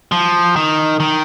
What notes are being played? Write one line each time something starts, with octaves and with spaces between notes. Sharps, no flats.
F3
D#3
D#3